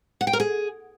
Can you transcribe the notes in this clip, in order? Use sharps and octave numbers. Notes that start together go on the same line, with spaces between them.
F#5
G5
A#4
G#4